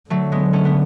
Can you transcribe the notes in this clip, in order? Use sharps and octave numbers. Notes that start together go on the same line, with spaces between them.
D3 F#3 A3
G#3 B3
A3 C#4
B3